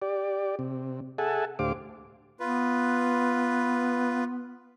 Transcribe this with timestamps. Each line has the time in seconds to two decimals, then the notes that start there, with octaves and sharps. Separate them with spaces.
0.02 G4 D5
0.59 C3
1.18 G#4 A4 E5 F#5 G#5 A5
1.59 D2 A2 G4 C5 F5 D6
2.40 B3 F4 B4